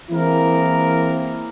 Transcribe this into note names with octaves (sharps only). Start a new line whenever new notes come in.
E3 G#3 A#3 C4 E4 A#4